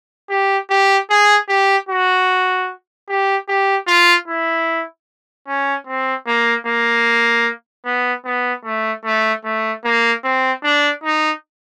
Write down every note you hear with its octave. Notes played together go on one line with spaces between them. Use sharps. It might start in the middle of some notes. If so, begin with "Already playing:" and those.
G4
G4
G#4
G4
F#4
G4
G4
F4
E4
C#4
C4
A#3
A#3
B3
B3
A3
A3
A3
A#3
C4
D4
D#4